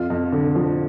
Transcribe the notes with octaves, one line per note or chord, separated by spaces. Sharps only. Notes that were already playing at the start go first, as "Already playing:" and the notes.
Already playing: F2 F4
F2
D3
F3